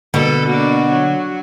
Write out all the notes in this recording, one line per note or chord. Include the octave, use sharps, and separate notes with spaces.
B2 D3 A#3 A4
A#3 D4 F#4
F#3